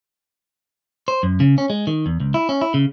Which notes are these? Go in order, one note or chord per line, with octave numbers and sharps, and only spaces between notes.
C5
F#2
C#3
C#4
G#3
D#3
E2
C#2
E4
C#4
E4
C#3